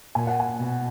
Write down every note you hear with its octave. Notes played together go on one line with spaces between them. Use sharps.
A#2 G#5
F#5
G#5
B2